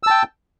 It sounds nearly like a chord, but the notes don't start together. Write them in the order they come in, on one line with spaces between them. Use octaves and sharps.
E6 A5 G5